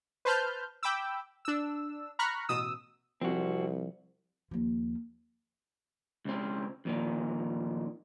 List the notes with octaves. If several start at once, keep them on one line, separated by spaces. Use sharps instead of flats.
B4 C5 A5 F6 G6
G5 B5 D6 E6
D4 E6
A#5 B5 C#6 F6 F#6
A1 B2 D#6 E6
C2 F3 C4 F#4
D#2 F3
C#2 C4
F2 A#2 D#3